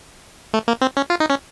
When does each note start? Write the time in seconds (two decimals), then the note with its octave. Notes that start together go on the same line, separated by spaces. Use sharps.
0.54 A3
0.68 A#3
0.81 C4
0.97 C#4
1.10 F4
1.20 D#4
1.30 C#4